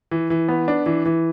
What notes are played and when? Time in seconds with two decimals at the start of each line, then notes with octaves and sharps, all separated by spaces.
0.11 E3
0.30 E3
0.48 B3
0.68 D4
0.86 E3
1.05 E3